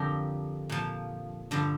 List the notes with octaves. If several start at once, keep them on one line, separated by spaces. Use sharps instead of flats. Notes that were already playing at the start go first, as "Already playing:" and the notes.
Already playing: F2 D3 F3 G4 A#4
A#2 F3
G2 D3 F3